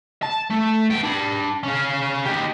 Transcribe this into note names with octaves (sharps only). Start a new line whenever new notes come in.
A5
A3
B3 G5
D4 B5
C#4 F5
D#4 G4